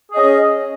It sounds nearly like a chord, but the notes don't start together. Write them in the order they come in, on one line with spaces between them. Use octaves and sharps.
G#4 D#5 C#4